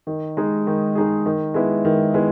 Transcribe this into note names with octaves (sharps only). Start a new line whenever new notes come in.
D#3
G#3 D#4 G#4
D#3
G#3 D#4 G#4
D#3
G#3 B3 E4
D#3
G#3 B3 E4